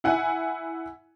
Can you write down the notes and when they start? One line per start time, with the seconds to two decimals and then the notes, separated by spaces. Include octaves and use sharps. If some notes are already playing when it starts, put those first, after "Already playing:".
0.04 E4 F#5 G#5